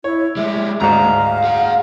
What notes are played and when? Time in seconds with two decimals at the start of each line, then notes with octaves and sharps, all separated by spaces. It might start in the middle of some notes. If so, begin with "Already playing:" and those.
0.04 E4 C#5
0.37 G3 G#3 E5
0.81 D2 G#2 F5 A#5
1.44 G#4 F#5